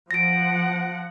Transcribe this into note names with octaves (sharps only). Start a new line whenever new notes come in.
F3 F#5 A#6 D7